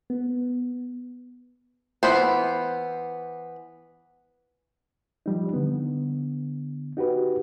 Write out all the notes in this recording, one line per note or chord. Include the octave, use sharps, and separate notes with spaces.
B3
E3 B3 C5
F3 G3 D#4
D3 B3
D#4 F#4 G4 B4